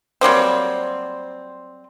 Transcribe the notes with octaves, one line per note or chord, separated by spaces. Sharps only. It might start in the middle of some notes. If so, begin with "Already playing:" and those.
F#3 G3 A#3 C4